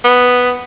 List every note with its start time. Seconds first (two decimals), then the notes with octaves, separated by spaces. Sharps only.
0.04 B3